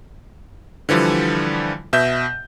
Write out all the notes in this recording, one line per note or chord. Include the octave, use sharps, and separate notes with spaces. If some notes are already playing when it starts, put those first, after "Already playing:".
D3 E3 F3 G3
B2 E5 G6